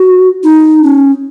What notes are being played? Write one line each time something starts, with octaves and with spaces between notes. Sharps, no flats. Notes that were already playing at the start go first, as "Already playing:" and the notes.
Already playing: F#4
D#4
C#4